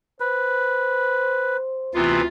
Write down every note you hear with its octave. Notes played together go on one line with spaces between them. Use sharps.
B4 C5
D2 C3 E3 B3 F4